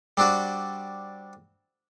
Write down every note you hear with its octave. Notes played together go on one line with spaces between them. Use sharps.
G3 C4 D4 F#4